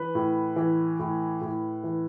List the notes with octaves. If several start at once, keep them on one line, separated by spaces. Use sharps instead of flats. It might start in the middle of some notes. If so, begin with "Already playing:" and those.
Already playing: E3 B4
A2
E3
A2
A2
E3